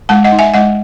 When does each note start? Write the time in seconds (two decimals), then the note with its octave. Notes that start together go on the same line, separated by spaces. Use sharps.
0.09 G#3 F#5 A5
0.24 D#5 F#5
0.32 D#4
0.39 E5 G#5
0.54 G#3 D#5 F#5